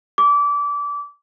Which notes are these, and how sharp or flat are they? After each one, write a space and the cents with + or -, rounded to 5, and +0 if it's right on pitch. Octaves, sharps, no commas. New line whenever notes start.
D6 -25